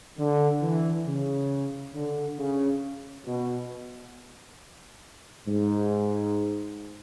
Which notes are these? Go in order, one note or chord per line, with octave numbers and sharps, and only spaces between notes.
D3
E3
C#3
D3
C#3
B2
G#2